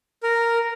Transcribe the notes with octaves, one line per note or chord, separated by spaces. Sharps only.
A#4